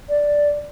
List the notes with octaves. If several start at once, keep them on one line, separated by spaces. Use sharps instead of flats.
D5